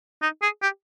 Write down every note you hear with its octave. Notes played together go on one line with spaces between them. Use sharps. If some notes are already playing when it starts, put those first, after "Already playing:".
D#4
G#4
G4